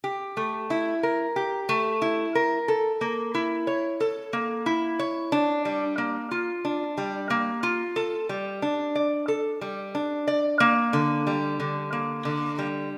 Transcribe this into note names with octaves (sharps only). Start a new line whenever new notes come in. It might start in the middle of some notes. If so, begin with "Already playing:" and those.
G4
A3
E4
A#4
G4
A3
E4
A#4
A4
A#3
E4
C#5
A4
A#3
E4
C#5
D4
G3
A#3
F4
D4
G3
A#3
F4
A4
G3
D4
D5
A4
G3
D4
D5
A#3
D3
G3
D3
A#3
D3
G3